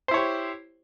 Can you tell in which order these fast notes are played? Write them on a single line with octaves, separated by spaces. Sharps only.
C5 E4 C#5 G4